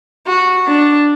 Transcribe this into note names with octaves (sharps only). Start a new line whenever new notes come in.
F#4
D4